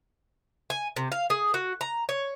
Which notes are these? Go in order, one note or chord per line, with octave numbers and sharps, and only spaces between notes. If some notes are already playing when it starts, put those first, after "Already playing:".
G#5
C3
F5
G#4
F#4
A#5
C#5